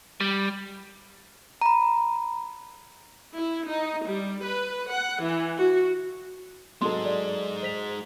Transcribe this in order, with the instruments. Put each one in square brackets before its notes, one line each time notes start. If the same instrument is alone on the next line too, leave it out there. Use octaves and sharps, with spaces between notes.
[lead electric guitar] G3
[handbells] A#5 B5
[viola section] E4
D#4
G3
B4
F#5
E3
F#4
[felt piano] F#3 A4 [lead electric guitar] G#3 D#4 [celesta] C6
[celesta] D5
C5 B6 F7